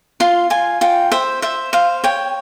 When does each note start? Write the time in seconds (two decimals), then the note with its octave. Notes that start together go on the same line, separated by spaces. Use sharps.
0.20 F4 C6
0.50 F4 G#5
0.81 F4 G5
1.12 C5 E5
1.42 C5 E5
1.73 C5 F5
2.04 C#5 G5